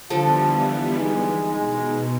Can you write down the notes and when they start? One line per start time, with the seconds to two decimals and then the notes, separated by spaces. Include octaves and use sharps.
0.10 D3 E3 F3 G3 B3 F4 A4
0.96 G#3 D#4
1.54 B2 G#3